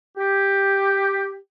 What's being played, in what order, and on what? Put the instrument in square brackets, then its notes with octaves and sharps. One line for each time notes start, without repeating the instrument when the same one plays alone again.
[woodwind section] G4